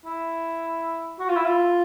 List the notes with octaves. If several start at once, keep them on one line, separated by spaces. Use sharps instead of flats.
E4
F#4
F4
E4
F4